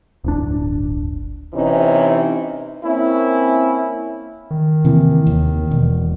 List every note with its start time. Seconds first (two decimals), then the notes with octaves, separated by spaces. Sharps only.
0.24 D1 G1 D4
1.54 C3 E3 C#4 D#4
2.84 A#3 C4 C#4 E4
4.51 D#3
4.85 C3 E3 A#3
5.27 D#2
5.71 E1 B2